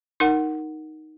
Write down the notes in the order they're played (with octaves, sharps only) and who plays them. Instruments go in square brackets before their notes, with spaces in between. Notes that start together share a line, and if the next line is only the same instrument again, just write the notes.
[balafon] D#4 A#4 F#5